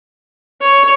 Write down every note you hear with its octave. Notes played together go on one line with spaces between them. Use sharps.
C#5